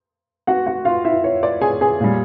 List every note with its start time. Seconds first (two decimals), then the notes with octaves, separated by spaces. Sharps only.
0.47 F#4 F#5
0.66 F#4 F#5
0.85 F4 F5
1.05 E4 E5
1.24 C#5
1.43 D5
1.61 G#4 G#5
1.81 G#4 G#5
2.00 A#2 G3